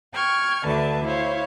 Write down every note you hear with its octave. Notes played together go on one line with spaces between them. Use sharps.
G5 C#6 F6 G#6
D2 D3 B4 E5 A5
E4 C5 C#5 F5